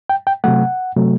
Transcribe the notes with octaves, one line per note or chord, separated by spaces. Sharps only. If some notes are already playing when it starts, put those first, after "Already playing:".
G5
G5
C3 F#3 A3 F#5
C3 F#3 A3